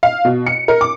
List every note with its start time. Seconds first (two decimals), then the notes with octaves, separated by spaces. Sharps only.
0.03 F5
0.25 B2
0.47 C#7
0.68 A#4
0.81 D6